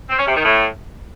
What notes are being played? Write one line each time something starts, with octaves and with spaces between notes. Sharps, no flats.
C4
C#4
C3
D#3
A2